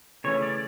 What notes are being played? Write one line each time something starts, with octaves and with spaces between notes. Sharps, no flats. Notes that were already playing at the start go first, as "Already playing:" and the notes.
C#3 E3 A3 C#4 C#5
D5